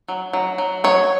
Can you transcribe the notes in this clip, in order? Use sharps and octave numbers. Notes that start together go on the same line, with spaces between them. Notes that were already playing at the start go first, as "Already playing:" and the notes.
F#3
F#3
F#3
F#3 C#5